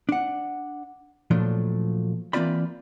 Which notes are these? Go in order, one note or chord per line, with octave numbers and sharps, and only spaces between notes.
D4 F#5
A#2 F3 F#3 A3 D4
E3 A#3 C4 F4 D5 B5